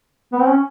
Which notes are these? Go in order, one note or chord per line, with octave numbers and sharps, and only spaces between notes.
B3
C4
C#4